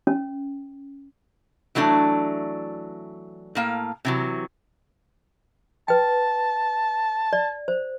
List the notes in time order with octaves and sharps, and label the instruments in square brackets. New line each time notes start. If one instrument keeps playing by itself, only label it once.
[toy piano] C#4
[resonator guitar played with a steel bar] E3 F#3 A3 D4
A2 A#3 F5
C3 E3 F#3
[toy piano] B4 G5 [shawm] A5
[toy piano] D5
C5